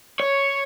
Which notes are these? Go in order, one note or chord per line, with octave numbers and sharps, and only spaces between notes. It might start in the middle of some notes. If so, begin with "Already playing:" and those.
C#5